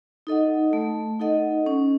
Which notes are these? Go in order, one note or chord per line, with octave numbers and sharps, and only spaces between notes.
D#4 A4 D#5 F#5
A3
D#4 A4 D#5 F#5
C#4